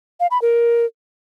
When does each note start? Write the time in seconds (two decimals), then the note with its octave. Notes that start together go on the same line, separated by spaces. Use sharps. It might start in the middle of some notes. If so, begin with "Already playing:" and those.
0.20 F5
0.31 B5
0.42 A#4